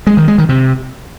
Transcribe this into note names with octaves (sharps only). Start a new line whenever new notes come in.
G#3
D#3
G#3
D#3
C3